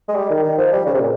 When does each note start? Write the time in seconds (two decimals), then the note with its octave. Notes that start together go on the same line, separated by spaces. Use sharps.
0.08 G#3
0.16 G3
0.30 D#3
0.43 D#3
0.58 F3
0.72 G3
0.86 C#3
0.94 C3
1.00 A#2